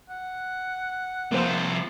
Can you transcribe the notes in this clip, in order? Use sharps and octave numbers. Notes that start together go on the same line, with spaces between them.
F#5
C2 F3 A#3 C5